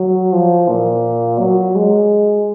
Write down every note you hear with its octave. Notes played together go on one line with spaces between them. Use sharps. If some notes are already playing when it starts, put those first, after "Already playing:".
Already playing: F#3
F3
A#2
F#3
G#3